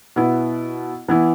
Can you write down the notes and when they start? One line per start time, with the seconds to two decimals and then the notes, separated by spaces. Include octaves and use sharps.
0.16 B2 B3 E4
1.08 E3 B3 E4